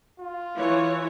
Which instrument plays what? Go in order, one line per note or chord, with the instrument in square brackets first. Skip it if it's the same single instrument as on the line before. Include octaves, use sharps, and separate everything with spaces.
[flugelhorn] F4
[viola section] E3 C#5